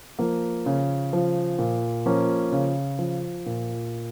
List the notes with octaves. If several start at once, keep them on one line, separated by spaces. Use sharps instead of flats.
F3 A#3
C#3
F3
A#2
F3 A#3 C#4
C#3
F3
A#2